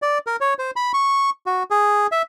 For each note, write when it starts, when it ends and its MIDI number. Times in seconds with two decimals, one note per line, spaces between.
0.02 0.18 74
0.27 0.36 70
0.41 0.54 73
0.59 0.71 72
0.76 0.92 83
0.94 1.30 85
1.46 1.63 66
1.71 2.07 68
2.12 2.22 76